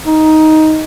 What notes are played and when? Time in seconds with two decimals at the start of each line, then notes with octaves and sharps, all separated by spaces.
0.06 D#4